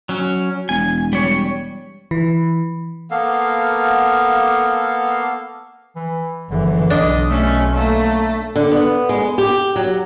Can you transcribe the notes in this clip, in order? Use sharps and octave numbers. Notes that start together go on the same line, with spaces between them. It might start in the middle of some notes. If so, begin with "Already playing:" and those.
F#3 C#4
E1 G#5
G3 C#5
E3
A#3 B3 A4 F5
E3
F#1 D3 E3
B1 D4 D#5
A3 C#4
A3 A#3
D3
B3
G#3
G4
F#3